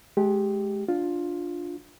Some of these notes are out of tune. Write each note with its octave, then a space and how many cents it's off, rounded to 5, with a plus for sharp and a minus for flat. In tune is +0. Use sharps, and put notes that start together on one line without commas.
G#3 +30 G4 +0
D4 +0 F4 +10